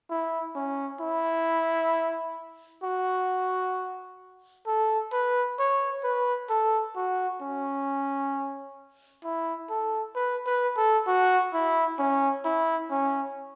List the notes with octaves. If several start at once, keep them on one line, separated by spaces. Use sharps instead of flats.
E4
C#4
E4
F#4
A4
B4
C#5
B4
A4
F#4
C#4
E4
A4
B4
B4
A4
F#4
E4
C#4
E4
C#4